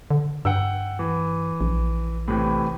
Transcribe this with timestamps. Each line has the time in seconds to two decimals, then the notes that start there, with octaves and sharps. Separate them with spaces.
0.10 D3
0.45 G2 F#5 G5 E6
0.99 E3
1.61 A#1
2.28 A2 C3 E3